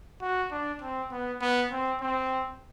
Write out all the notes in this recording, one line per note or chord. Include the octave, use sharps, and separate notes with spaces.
F#4
D4
C4
B3
B3
C4
C4